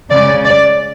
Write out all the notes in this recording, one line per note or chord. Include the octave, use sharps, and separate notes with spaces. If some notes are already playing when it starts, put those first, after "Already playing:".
C#3 G#3 C#4 D5
D5